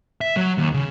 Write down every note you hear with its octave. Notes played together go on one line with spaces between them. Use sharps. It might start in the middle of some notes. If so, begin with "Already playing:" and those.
E5
F#3
D#2
C#3